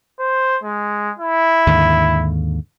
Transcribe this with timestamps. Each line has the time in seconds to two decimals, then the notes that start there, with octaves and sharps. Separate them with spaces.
0.20 C5
0.63 G#3
1.19 E4
1.67 D#2 G#2 D3